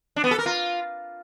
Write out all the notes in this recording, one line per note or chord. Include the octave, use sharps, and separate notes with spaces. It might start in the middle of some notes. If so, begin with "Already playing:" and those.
D4
B3
A4
A#4
F4